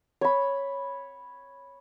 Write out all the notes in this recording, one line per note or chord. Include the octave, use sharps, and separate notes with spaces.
C#5 B5